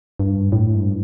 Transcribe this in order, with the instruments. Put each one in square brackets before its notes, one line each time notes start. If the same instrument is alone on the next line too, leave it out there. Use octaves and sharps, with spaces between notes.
[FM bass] G2
A2
G2